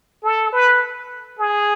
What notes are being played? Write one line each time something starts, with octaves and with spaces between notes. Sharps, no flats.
A4
B4
G#4